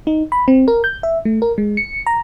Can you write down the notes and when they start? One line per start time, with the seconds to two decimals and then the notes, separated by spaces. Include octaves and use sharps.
0.07 D#4
0.32 B5
0.48 C4
0.68 A#4
0.84 G6
1.03 E5
1.25 A3
1.42 A#4
1.58 G#3
1.77 C#7
2.07 A#5